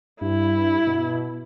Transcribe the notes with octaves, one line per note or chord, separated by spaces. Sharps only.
G2 E4
B2